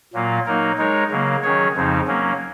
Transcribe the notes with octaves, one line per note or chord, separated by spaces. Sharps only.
A#2 F#3 A#3 F4
F#3 A#3 D#4 A#4
G#3 D#4 A#4 C#5
C#3 F#3 A#3
D#3 F#3 C#4 G#4 C#5
F2 C#3 F3 C4 D#4
F#3 A#3 C#4